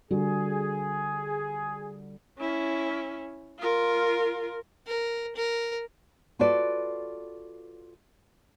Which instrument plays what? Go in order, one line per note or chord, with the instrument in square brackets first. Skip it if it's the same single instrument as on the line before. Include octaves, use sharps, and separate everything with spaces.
[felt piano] D3 G3 F#4 [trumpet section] G#4
[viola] C#4 E4
F4 A#4
[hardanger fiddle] A#4
A#4
[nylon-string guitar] F4 F#4 A4 B4 D5